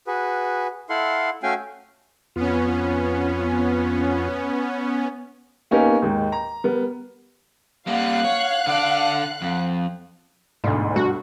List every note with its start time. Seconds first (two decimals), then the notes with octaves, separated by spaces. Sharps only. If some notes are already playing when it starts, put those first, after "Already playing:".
0.07 F#4 G#4 B4
0.89 E4 A4 F5 F#5 C6
1.43 A3 C#4 F#4 F5 G5 G#5
2.36 F2 B3 C#4 F4
5.71 A#3 B3 C#4 D#4 G4 A#4
6.02 D#2 G#2
6.32 A#5
6.64 G3 B3 A#4
7.87 G3 A#3 F5 F#5 F#6
8.24 C#5
8.67 D3 D5
9.42 F2
10.64 G1 D2 G#2
10.96 G2 F#4